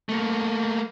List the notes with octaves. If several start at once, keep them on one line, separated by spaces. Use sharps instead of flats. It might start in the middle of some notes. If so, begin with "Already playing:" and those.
A3 A#3